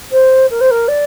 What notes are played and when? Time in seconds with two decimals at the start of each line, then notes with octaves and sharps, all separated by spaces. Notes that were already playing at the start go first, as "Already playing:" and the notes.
0.11 C5
0.50 A#4
0.61 C5
0.71 A#4
0.88 D5